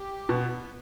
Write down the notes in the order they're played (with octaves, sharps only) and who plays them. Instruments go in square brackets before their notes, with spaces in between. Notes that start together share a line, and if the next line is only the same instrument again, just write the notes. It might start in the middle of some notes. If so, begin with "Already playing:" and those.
Already playing: [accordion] G4
[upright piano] B2 [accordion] B3